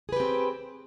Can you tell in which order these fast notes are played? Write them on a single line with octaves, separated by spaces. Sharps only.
G#4 B4 G4 C4